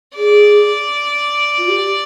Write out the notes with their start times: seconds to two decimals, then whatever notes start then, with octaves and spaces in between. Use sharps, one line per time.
0.15 G#4 D5
1.58 F4
1.69 G4